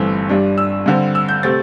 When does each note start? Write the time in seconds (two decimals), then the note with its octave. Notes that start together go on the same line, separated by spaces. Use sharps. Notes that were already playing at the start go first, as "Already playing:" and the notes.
Already playing: G1 G2 E3 A3 C4 E6
0.29 G2 G3 D4
0.58 E6
0.86 G2 D3 C4
1.15 E6
1.29 G6
1.43 C3 A3 C4 A6